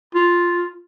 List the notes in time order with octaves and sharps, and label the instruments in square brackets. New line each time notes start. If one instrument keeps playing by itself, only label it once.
[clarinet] F4